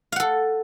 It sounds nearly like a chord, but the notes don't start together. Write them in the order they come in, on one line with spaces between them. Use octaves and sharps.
F5 F#5 A4